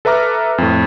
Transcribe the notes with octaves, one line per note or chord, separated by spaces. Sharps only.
A4 B4 E5 A#5 D6 F6
F2 A2